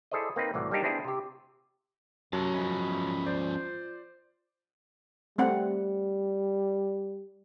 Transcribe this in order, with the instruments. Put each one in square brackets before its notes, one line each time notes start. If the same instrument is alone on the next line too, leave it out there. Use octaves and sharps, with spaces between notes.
[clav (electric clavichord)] E4 G#4 A4 C5 D5 D#5
A#3 C4 D#4 B4
C2 A2 E3 F#4 D5
G3 A#3 C4 D4 D#4 G4
B3 C4 D4 E4 G#4 C5
C3 G4
[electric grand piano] F#2 F#3 [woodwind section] C3 [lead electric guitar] C#5 A5
[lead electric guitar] F3 C#4 [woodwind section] D#5 E5 B5
[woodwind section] F4 C5 [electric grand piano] D5
[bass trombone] G3 [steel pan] A3 C4 F#5